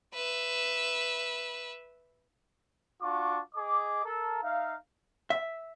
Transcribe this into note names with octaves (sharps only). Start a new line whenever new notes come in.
B4 E5
D4 F4 F#4 C#6 D6
G#4 D#5 D6
A4 A#4
D#4 E5 F5
E5